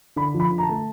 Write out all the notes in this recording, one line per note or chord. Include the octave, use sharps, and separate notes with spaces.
D3 B5
F3
B5
D3
A#5
A5
A3